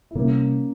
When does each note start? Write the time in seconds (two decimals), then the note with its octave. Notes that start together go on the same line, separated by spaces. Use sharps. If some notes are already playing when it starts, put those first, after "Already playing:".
0.11 E4
0.15 C3 G3 A#3 C4 C#4